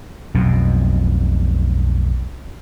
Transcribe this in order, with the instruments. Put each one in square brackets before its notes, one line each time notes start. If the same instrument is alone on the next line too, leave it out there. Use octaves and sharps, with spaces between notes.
[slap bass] B1 F2 B2